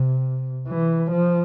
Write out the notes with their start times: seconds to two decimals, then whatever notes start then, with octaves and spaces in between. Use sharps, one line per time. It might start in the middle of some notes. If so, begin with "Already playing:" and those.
Already playing: C3
0.68 E3
1.11 F3